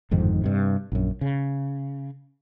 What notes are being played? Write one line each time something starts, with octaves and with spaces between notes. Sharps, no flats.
G1 F2 G#2 D#3
G2 C3
A#1 F#2
C#3